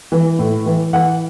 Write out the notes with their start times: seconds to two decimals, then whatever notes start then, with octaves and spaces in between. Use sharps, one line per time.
0.12 E3
0.39 A2
0.66 E3
0.93 E3 F#5